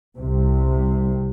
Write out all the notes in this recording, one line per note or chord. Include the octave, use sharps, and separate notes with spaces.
C2 C3